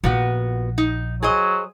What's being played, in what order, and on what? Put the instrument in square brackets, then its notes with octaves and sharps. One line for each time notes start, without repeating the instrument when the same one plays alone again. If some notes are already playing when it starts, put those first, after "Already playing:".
[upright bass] A#1 [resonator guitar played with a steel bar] A#2 B3 F#4
[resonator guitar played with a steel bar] D#4
[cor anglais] F#3 [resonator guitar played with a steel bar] G#4 C5 D#5